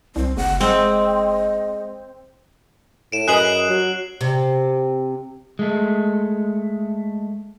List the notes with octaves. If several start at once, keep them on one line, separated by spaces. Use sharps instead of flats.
C2 C4
F#1 F#5
G#3 C4 D#5
A2 D7 E7
F#2 G#4 B4 D#5 F#6 C7 F#7
F#3
C3
G#3 A3